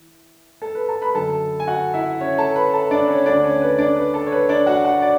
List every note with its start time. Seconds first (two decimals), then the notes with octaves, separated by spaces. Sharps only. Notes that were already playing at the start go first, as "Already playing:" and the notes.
Already playing: E3
0.62 A4
0.75 B4
0.89 A4 A5
1.02 B4 B5
1.15 F#2 D3 A4 A5
1.60 G#5
1.67 F#4 F#5
1.94 E4 E5
2.20 C#4 C#5
2.38 A4 A5
2.55 B4 B5
2.73 A4 A5
2.91 D4 D5
3.08 C#4 C#5
3.25 D2 D3 D4 D5
3.43 C#4 C#5
3.62 B4
3.78 D4 D5
3.96 B4
4.14 A4
4.26 C#5
4.32 B4
4.49 D4 D5
4.66 F#4 F#5
4.84 F#4 F#5
5.02 D5